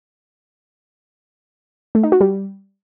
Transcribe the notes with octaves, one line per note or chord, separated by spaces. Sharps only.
A3
D#4
F#4
G3